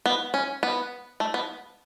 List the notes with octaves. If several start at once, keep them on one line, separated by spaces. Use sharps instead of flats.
B3
C#4
B3
A3
B3